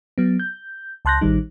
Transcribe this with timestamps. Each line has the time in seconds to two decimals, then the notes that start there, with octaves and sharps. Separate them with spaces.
0.18 F#3 B3
0.40 G6
1.05 C#2 A5 C6 F#6 G6 A#6
1.21 A1 D#3 G3 D#4